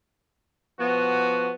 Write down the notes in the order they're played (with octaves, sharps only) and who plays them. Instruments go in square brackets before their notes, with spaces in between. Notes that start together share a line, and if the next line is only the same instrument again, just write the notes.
[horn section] F3 B3 F#4